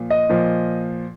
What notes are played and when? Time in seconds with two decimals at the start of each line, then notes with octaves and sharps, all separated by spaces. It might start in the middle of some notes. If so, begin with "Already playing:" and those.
Already playing: A#2 F3
0.10 D#5
0.29 A#2 F3